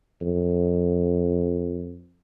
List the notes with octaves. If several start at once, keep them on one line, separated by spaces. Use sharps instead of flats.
F2